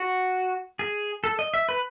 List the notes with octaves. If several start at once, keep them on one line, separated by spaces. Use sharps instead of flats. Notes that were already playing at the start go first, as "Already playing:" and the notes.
Already playing: F#4
G#4
A4
D#5
E5
B4